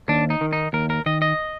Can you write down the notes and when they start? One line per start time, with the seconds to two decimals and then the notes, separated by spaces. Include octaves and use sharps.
0.08 D#2 D4
0.30 D#4
0.41 D#3
0.53 D#4
0.73 D#2 A#4
0.90 A#4
1.06 D#3 D#5
1.22 D#5